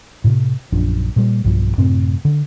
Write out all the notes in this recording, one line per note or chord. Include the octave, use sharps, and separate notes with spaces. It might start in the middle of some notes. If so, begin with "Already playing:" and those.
A2 C3
A#1 F#2 F3 D4
A#2 G3
B1 G2 B2 F3
F#2 A2 C3 C4
D3